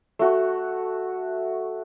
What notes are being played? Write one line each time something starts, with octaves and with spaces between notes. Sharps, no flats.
A3 F#4